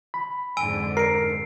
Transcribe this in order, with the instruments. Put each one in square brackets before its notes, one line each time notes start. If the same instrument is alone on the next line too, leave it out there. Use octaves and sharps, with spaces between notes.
[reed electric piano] B5
[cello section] F2 G#2 D3 [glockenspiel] G#5 E6 D7
[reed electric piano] A#4 [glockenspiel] C7 D7